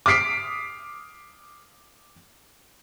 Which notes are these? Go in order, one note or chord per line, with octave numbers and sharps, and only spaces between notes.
D6 D#6 F6 B6 C7 D7